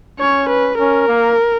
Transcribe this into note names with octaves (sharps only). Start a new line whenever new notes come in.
C#4 C#5
B4
C#4 A#4
A#3